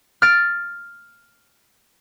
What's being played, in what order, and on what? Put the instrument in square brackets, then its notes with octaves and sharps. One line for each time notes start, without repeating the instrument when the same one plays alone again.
[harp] F6 A6 D7